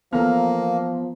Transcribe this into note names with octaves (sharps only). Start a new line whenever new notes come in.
E3 F3 A#3 B3 A4 A#5 F6